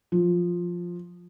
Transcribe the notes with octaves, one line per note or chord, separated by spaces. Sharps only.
F3